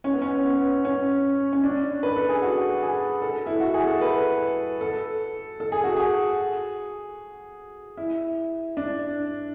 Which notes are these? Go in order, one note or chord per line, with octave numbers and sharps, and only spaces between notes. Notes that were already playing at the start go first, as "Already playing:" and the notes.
C#4
B3
C#4
B3
C#4
C#4
D4
B4
A4
G#4
F#4
G#4
A4
E4
F#4
G#4
A4
B4
A4
A4
G#4
F#4
G#4
E4
D4